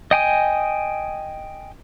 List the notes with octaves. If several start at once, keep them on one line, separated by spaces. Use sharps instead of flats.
D#5 G5 G#5 D#6